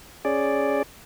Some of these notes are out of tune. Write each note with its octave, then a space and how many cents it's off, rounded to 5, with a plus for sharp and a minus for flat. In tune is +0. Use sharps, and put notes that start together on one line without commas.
C#4 +0 G#4 +0 D5 +0